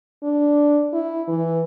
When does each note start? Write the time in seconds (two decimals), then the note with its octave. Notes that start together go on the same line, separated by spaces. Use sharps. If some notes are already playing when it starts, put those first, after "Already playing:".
0.23 D4
0.93 E4
1.28 E3